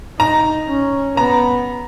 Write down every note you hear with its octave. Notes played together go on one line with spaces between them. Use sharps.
D#4 A#5
C#4
B3 A#5